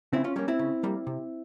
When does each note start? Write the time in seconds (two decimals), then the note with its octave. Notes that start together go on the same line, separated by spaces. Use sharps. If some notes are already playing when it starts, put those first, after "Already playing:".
0.13 C#3 C4 E4
0.24 C#4 F4
0.36 G3 A#3 C#4
0.48 C4 E4
0.59 C#3
0.83 G3 A#3
1.07 C3